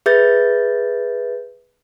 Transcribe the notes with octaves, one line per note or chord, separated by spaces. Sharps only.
G#4 B4 E5 G6 A6